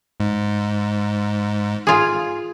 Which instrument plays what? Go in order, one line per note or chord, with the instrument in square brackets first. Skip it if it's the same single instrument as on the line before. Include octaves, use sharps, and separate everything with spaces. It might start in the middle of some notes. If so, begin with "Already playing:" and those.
[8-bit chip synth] G#2
[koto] F4 G#4